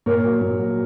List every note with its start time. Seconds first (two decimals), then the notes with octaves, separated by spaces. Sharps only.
0.06 A#2 A#4 C#5
0.25 F#3
0.42 A#2
0.59 F#3